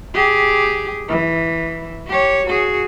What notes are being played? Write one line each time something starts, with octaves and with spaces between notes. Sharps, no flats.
G4 G#4
E3
G4 C#5
F#4 G#4